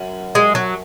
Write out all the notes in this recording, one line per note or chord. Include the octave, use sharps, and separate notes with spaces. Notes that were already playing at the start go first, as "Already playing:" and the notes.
Already playing: F#2
G#3
F#3